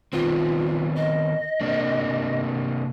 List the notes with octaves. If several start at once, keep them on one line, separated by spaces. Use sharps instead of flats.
D#3 B3 C4 F4
D#5
C3 A#3 D4